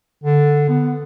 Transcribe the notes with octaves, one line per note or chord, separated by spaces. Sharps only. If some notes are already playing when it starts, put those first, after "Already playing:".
D3
B3